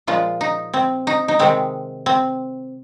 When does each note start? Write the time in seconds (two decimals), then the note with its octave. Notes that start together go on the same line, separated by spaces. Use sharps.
0.07 A#2 F3 G#3 F4
0.41 D#4
0.74 C4
1.07 D#4
1.28 D#4
1.39 C3 D#3 G#3 C4
2.06 C4